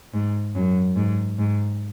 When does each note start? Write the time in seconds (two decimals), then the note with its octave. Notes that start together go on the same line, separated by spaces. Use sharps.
0.14 G#2
0.56 F#2
0.96 G#2
1.39 G#2